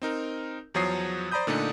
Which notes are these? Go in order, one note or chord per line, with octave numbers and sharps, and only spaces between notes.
C4 D#4 A#4
E2 F3 F#3 C#5 D#6 C7
C5 D5 A#5 B5 D#6 G6
A#2 D3 A3 D4 D#4